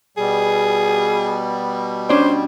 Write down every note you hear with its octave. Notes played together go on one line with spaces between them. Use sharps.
B2 G3 G#4
C#4 D4 C5 D5